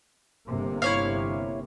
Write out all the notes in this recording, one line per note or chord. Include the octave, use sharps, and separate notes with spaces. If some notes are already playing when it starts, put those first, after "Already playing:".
G1 C3 A#3
E4 C#5 F5